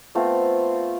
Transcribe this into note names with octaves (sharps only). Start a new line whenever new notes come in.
A3 B3 C4 F4